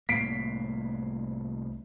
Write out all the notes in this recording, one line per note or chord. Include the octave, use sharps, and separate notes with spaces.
C2 A2 A#3 B6 C7 D7